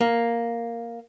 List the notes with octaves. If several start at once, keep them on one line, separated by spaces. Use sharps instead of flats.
A#3